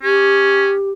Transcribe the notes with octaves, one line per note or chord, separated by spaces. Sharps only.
C#4 G4